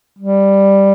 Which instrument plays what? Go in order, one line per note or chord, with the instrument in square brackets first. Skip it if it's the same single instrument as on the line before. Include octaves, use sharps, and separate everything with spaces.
[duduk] G3